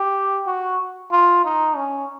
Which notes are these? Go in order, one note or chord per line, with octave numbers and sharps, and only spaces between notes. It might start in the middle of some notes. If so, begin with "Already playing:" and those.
Already playing: G4
F#4
F4
D#4
C#4